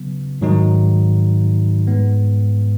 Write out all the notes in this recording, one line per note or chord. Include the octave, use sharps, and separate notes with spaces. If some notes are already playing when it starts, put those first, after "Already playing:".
Already playing: C#3 F#3 B3
G#2 D#3 F#3 D#4
G#2 G#3 B3